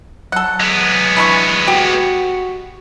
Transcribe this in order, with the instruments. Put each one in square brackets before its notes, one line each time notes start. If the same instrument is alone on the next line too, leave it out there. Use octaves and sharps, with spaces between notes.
[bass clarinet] F#3 [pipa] A4 F#5
[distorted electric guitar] G#3 B3
[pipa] E3 D4 C#6
[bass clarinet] F#4 [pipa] G4